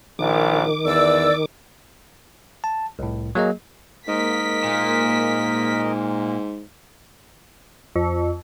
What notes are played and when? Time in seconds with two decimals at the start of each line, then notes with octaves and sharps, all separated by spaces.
0.19 A#1 D#3 D6
0.85 E2 D5 E6
2.64 A5
2.99 C2 A2
3.35 F#3 A#3 G#4 D#5
4.08 G#2 A#3 A#4 D#5 B6
4.64 A#2
7.96 F2